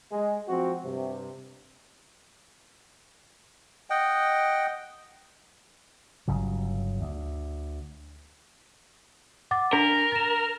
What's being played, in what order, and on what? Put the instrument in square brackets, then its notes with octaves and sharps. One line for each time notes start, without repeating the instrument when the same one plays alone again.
[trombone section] G#3
F3 C4 F#4
G2 C3
[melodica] D#5 F#5 G5
[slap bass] G1 C#3 F#3
D2
[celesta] F#5 D6 A6
[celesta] D4 B6 [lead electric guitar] A#4
[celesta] A6 E7